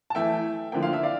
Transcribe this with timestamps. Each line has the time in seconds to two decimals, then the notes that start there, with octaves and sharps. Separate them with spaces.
0.10 A5
0.15 E3 A3 E4 E5 G5
0.72 D3 F3 A#3 E4 G5
0.83 F5
0.93 E5
1.03 D5 F5